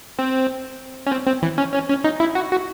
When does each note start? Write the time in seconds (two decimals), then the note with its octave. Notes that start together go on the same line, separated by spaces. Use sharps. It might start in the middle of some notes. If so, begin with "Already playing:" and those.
0.19 C4
1.07 C#4
1.12 C4
1.27 C4
1.42 E3
1.58 C#4
1.74 C#4
1.89 C#4
2.04 D#4
2.20 E4
2.35 F#4
2.51 F#4